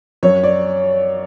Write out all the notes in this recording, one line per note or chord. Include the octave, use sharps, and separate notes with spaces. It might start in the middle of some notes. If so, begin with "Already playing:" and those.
F#2 C#5
D5